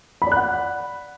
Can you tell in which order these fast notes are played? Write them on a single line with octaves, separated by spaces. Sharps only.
B5 D5 F#6 F#5